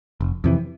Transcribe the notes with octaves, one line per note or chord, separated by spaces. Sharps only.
F1
F2 C3 E3